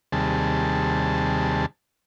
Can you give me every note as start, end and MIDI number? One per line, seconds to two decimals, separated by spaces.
0.12 1.66 39
0.12 1.66 48
0.12 1.66 55
0.12 1.66 68
0.12 1.66 81